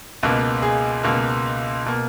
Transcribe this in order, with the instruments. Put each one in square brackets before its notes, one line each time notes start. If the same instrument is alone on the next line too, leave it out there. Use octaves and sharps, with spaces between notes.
[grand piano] C#2 B2 A#3
G#4
C#2 B2 A#3
B2 A#3